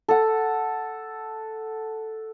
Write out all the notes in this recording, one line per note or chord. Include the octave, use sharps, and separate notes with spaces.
A4 F#5